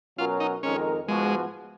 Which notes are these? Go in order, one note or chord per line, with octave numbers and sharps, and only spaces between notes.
B2 F#3 C#4 F4 F#4 A#4
D#4
F2 D#3 G#3 C#4 D#4 A#4
G#2 F3 G#3 B3 F#4